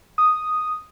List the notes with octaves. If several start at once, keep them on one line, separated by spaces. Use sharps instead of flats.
D#6